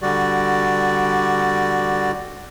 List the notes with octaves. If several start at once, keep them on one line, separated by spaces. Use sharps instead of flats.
D3 G3 F#4 D5